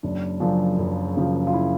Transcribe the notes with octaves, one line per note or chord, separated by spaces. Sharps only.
F#1 D4
F#2 C#3 F3 D4
F#1
F#2 C#3 F3
F4
E4